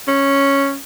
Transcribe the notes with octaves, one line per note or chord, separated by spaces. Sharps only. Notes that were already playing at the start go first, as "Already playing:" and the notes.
C#4